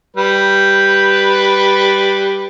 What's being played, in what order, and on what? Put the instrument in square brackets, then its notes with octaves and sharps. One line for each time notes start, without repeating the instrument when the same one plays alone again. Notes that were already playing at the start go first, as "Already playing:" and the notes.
[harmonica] G3 B4